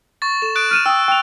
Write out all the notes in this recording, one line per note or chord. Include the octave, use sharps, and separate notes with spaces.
C#6 A6
A4 E7
D#6 F#6 D7
F6 D#7 E7
G5 D#6 E6
G5 F7